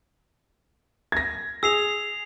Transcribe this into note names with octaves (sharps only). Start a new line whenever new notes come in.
G#6 A#6
G#4 E6 C7 F7